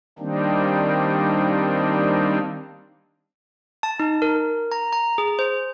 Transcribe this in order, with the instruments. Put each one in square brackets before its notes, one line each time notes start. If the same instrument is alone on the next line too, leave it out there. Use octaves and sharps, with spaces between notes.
[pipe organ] D#3 G3 A#3 C4 D4 D#4
[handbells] A5
D#4
A#4
A#5
A#5
G#4
C5